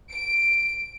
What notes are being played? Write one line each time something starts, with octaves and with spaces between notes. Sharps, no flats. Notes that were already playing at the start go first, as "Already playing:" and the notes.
D7